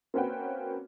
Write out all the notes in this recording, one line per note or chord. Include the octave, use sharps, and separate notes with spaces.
A#3 C4 C#4 F#4 B4 G5